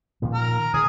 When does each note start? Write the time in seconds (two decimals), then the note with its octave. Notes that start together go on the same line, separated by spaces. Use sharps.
0.22 A#2 D#3 F3
0.35 A#5 F6
0.74 D#3 G#5 D#6